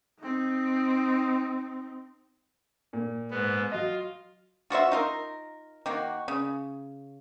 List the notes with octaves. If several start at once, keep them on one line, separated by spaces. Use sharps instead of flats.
C4 D#4
A#2
G#2 B3
F#3 F4 D#5
F4 F#4 C5 E5
D#4 F4 A#4
D#3 A#3 F#4
C#3